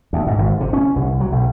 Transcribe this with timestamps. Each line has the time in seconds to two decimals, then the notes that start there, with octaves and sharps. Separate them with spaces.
0.13 D2
0.27 G#2
0.38 G#1
0.60 C3
0.73 C#4
0.96 C2
1.20 F#3
1.32 B1